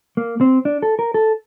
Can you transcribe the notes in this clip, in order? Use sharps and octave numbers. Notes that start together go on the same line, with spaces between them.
A#3
C4
D4
A4
A#4
A4